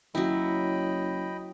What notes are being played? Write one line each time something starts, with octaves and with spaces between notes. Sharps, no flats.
F#1 F#3 E4 D#5 G5 B5